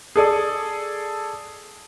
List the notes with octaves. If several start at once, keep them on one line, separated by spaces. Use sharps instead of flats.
G#4 A4 D5 D#6